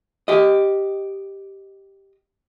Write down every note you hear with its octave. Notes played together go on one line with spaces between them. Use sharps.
G4 D#5